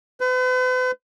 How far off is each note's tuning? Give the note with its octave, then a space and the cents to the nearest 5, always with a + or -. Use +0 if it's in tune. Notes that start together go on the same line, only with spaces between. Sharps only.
B4 +45